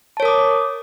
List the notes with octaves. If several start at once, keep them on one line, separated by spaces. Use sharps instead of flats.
A#4 C#5 A5 D6 D#6